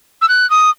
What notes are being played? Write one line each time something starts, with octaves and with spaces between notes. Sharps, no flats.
E6
F#6
D#6